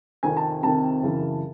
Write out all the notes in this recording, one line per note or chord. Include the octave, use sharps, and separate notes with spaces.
F2 C3 D#3 G#5
A5
F2 C3 D#3 A5
F#2 C#3 E3